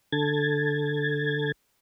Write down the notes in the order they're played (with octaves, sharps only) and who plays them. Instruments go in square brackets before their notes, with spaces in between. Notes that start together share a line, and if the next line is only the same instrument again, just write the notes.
[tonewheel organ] D3 A4 G#6 A6